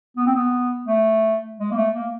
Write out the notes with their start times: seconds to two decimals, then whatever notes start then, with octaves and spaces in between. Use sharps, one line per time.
0.17 B3
0.26 C4
0.36 B3
0.87 A3
1.60 G#3
1.71 A#3
1.76 A3
1.94 A#3